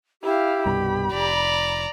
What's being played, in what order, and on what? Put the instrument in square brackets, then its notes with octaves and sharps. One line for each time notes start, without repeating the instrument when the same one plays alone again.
[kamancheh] E4 F5 [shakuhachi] G4
[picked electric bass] C2 G2 B2 [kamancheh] B5
[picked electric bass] F1 [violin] D5 A#5